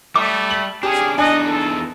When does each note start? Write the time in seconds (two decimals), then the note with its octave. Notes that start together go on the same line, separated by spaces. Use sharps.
0.16 G3 A3 D6
0.50 F#7
0.83 C#4 D4 G4 G#4
1.18 E2 D4 D#4 D#5 G#5 F#6
1.47 A4